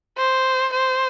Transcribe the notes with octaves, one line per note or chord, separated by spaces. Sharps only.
C5
C5